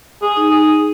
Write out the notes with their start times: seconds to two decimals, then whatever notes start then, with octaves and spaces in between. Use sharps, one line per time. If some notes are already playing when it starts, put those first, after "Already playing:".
0.22 G#4
0.37 D#4
0.51 G#4